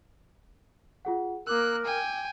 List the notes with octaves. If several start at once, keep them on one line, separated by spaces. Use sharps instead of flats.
F4 G#4 F#5
A#3 A#4 D6 E6 F#6
G5 G#5